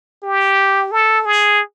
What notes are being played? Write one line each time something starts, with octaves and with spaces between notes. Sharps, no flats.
G4
A4
G#4